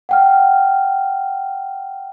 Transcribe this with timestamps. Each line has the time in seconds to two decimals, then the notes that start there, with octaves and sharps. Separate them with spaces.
0.09 F#5 G5 F6